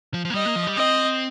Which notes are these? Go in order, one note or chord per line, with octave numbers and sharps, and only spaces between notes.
F3
F3
A#3
G3 D#5
A#3
F3
G3
C4 D#5